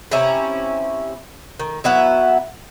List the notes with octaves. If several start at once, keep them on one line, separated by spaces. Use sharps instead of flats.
C3 C#4 E4 A#5
D#3
F#3 B3 E4 E5